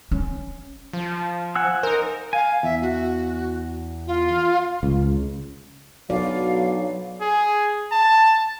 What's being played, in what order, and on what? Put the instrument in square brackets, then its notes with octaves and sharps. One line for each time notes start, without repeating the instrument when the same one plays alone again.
[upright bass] C#4
[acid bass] F3
[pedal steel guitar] F#5 G#5 E6
[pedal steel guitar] D#4 C5 [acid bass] A#4
[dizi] F5 [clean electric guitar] G#5
[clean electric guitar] E2 [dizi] E5
[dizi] F#4
F4
[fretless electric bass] C#2
[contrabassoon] B1 [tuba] F#3 [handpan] D5 [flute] F5
[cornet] G#4
A5